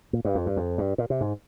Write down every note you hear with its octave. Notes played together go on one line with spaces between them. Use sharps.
A#2
G2
F2
G2
F2
G2
A#2
C3
G#2